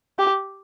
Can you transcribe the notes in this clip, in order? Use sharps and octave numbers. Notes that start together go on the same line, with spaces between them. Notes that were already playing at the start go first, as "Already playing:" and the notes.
G4